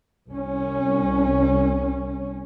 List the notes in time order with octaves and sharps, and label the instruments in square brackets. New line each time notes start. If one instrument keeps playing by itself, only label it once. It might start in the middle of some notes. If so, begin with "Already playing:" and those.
[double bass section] C2 C#4